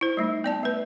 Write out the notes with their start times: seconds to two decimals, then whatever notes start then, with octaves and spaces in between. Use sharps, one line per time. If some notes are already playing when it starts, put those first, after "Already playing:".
0.01 E4 C5
0.17 G3 A3 D#4
0.44 B3 D5 A5
0.63 A3 B4